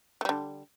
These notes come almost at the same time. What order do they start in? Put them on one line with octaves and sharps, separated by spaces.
A3 G3 D3